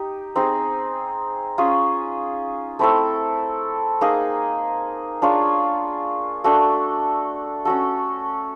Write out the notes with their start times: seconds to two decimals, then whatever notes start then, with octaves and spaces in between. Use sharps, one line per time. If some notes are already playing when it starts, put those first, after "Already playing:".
Already playing: D#4 G4
0.35 C4 D#4 G#4
1.58 C#4 F4 G#4
2.79 A3 C4 E4 A4
4.01 A#3 D#4 G#4
5.22 D4 F4 G#4 C#5
6.44 A3 D4 F#4 A4
7.65 C#4 F#4 A4